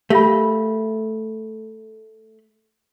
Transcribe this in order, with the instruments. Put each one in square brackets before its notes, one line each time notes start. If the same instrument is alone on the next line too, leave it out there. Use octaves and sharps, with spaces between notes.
[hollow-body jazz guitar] A3 [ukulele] G4 [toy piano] A#4 F5 B5